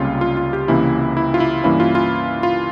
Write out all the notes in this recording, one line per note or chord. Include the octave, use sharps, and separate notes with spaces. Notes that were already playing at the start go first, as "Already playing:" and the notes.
Already playing: C#2 C3 G3 A#3 C#4 F4
F4
F4
G4
C#2 C3 E3 A#3 C#4 E4
E4
F4
E4
G2 E3 A#3 C#4 E4
F4
F4
F4